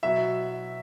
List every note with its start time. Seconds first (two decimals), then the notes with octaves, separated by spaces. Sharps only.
0.03 B2 F#3 E5